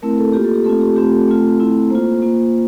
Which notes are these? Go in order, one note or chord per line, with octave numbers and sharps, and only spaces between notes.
A3 C4 E4 A#4
A4
A#3 F4 G4
A4
G4
A3 C4 F4 A4
G4
A3 C4 F4 G4
A4
A3 C4 F4
A3 C4 E4
A#3 F4 C5
A#3 F4